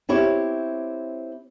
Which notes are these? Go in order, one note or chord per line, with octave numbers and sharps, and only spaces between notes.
C4 E4 G4 C#5